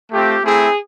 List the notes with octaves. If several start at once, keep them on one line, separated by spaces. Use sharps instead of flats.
A3 C4 F4 G4
A3 C4 E4 G#4